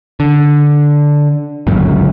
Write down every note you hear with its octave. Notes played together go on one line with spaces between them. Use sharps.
D3
G1 C#2 F#2 A#2